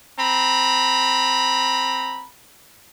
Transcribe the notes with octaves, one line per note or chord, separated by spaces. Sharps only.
C4 A#5 B5